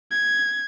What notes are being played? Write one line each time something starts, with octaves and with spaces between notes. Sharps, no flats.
G#6